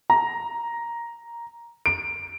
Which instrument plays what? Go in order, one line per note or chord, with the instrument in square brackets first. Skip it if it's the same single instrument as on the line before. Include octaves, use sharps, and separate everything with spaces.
[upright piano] A#5
D7